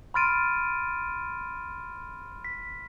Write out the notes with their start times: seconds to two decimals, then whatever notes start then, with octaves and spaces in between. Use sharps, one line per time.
0.14 B5 C6 F6 A6 D7 D#7
2.45 B6